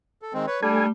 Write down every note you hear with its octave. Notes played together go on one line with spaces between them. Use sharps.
A4
D#3 G#3 C4
B4 C#5
G3 A3 D4 A4 G#5